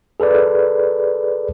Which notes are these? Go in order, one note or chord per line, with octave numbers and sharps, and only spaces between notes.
G#4 A4 B4 D5